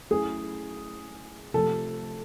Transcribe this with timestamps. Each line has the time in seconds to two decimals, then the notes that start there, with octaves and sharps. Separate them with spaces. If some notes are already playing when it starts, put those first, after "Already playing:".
0.11 F#3 A3 C#4 E4 G#4
1.54 C3 F3 A3 A4